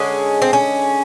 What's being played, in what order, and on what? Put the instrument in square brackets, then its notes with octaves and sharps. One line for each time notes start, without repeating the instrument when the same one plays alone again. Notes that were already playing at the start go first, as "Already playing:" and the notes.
Already playing: [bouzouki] D3 G#3 C#4
C4
C#4